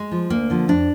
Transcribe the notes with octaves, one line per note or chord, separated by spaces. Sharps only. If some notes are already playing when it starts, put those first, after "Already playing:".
Already playing: G#3
F3
D2 A#3
D3 F3
F2 D4